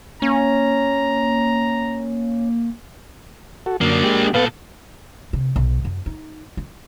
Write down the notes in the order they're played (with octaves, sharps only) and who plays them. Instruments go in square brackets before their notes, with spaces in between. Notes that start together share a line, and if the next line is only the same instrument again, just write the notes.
[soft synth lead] A#3 [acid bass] C#4 [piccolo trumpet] A#5
[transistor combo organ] F#4 A4
[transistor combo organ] F#2 D3 [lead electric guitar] A#3 D4
[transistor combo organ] G#3 G4
[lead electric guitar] A#2 A4 [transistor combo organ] B3 B4 F5
[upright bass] C3
B1
F#2
D#4
F4